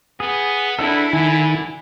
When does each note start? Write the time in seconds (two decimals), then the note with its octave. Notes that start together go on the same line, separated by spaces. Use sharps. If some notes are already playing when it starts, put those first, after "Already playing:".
0.20 B3 G#4
0.79 E2 D4 E4 A4
1.13 D3 D#3 G#5